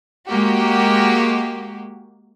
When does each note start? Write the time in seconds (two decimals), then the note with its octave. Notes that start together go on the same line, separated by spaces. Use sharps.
0.27 G#3 A#3 F#4 G4